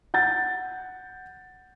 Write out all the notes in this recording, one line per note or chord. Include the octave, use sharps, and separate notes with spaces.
F#5 G6 A6